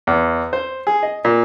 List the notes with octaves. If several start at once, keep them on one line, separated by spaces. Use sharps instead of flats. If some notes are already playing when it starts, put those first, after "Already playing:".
E2
C5
G#4
D#5
A#2